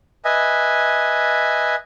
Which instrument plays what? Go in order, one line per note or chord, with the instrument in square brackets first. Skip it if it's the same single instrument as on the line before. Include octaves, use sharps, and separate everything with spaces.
[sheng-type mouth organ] B4 D#5 E5 G#5